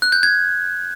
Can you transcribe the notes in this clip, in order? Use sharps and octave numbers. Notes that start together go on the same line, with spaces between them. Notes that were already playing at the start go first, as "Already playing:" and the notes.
F#6
G6
G#6